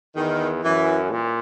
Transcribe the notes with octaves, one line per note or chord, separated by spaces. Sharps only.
E2 D#3
F#2 E3
A#2